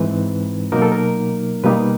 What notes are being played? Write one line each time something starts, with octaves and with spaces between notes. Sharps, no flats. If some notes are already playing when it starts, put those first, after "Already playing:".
Already playing: G#2 E3 G#3 C4 D#4 B4
B2 F#3 A#3 D#4 A#4
A4
A#4
B2 G3 A#3 D#4 B4